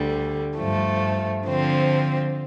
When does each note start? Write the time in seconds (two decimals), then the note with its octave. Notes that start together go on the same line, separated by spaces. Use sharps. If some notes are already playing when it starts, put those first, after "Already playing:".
Already playing: D2 D3 G3
0.58 G2 F3 A3
1.46 D3 F3 C4